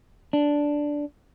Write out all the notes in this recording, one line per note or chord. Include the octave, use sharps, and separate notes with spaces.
D4